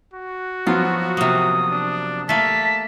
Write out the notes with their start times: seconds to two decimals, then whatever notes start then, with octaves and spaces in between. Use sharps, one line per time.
0.14 F#4
0.67 F3 F#3 B3 F4
1.17 C3 A#3 D#6
1.71 D4
2.29 A3 A#3 A5 B6